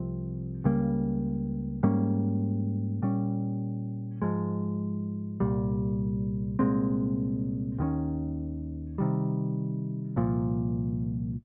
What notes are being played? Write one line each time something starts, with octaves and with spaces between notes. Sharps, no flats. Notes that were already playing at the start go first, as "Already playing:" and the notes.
Already playing: C2 C3 F3 C4
C#2 C#3 G3 A#3
G#2 G3 A#3 C#4
A#2 G3 C#4
G#2 F3 G#3
C2 A#2 G3
C2 A#2 G#3 C4
D#2 D#3 G#3 C#4
C3 D#3 G3
C2 A#2 F3